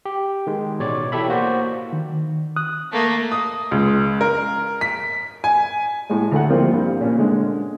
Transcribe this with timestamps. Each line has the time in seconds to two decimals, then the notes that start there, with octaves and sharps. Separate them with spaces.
0.05 G4
0.47 D#3 G#3
0.79 A1 B2 C#5 D5
1.12 E4 G4 A4 E5 B5
1.28 A#3 F#4 C5 D5
1.93 D#3
2.56 D#6 F#6
2.92 A3 A#3
3.32 D#6
3.71 C#2
4.21 A#4
4.81 B6
5.44 G#5
6.10 A2 G#3
6.31 D2 A3 F#5
6.49 F3 G3 A#3 C4 E4 F4
6.73 G2 C5
7.00 A#2 C#4
7.18 D3 G#3